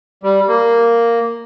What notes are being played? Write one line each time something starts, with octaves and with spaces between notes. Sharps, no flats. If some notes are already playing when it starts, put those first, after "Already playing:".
G3
A#3